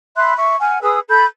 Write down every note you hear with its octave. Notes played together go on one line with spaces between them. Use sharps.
E5 B5 C6 F#6
E5 C#6
F#5 G#5 F6
G#4 B4 D#6 E6
A4 B5 G6